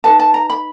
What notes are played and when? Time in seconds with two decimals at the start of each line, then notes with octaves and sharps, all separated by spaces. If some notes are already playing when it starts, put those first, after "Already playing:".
0.04 D#4 G#4 B4 A5
0.19 A5
0.34 A#5
0.50 B5